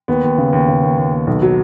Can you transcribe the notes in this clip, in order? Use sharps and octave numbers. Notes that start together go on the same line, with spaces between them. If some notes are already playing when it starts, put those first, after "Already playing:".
D#2 B3
D#2
C#3
D#2
C#3
D#2
D#2
D#2
B1
F#3